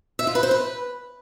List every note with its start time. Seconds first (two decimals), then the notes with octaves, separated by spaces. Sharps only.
0.19 E5
0.27 F4
0.35 B4
0.43 C5
0.51 B4